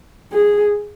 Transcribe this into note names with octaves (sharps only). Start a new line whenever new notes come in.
G#4